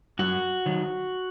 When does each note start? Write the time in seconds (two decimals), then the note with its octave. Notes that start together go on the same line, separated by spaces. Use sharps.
0.19 F#2 F#4
0.66 D#3 F#3